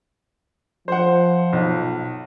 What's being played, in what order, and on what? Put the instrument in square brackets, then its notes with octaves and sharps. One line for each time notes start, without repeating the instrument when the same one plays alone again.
[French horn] F3 [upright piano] C5 F#5
[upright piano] B1